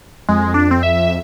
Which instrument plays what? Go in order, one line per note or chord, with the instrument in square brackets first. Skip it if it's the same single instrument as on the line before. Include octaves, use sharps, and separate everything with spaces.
[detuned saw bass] F2 [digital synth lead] G#3
[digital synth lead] D4
C4
E5